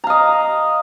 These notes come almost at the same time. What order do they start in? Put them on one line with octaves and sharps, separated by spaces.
A#5 F5 D#5